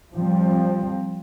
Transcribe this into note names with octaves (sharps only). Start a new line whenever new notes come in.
F3 G3 C4